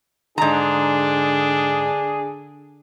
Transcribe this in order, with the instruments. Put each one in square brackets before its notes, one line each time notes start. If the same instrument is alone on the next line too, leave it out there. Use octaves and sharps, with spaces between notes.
[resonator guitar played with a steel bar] G#2 A#5 [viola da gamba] D3 [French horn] D4 [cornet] G#4